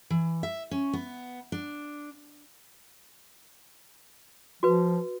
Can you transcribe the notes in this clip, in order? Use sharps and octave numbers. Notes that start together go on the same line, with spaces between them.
E3
E5
C#4
B3
D4
F3 F#4 B4